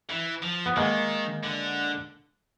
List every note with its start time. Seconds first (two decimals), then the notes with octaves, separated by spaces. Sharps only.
0.10 E3
0.43 F3
0.66 B3
0.77 D#3 G#3 A#3
1.43 D3